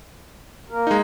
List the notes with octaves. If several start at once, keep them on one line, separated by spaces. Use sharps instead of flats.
A#3 A#4
G#3 D#4